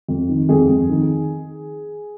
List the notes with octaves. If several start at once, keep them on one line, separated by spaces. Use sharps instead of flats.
F2
D#3
F2 G#4
F2
D#3